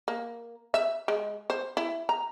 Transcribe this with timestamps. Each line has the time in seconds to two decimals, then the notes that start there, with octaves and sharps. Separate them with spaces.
0.08 A#3
0.74 E5
1.08 G#3
1.50 C5
1.77 E4
2.09 A#5